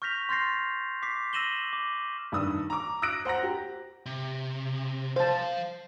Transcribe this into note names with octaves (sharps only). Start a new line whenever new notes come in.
C#6 F6 G6 A#6 B6 F7
C6 F6 G6 A6 A#6 C7
D6 B6 C7
E6 A#6 D#7 E7 F#7 G7
D6
G2 D#3 D#6 E6
A#5 D6
D#6 E6 F#6 A#6 D7
C5 F#5 A#5 A#6
G4
C3
F3 C5 F5 A5